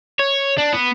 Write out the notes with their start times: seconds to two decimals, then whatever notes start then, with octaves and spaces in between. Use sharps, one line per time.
0.19 C#5
0.58 D4
0.73 B3